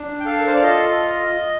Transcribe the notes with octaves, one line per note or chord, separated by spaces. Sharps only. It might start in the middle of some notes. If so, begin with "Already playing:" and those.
Already playing: D4
G5
A4 F5
A#4
C5
D5
F4 D#5